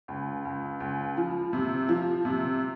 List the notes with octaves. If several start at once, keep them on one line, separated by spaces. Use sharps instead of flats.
C#2
C#2
C#2
F3
C3
F3
C3